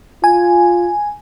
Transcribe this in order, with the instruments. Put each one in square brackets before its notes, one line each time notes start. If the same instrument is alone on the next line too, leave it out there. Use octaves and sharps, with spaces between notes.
[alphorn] F4 [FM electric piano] G#5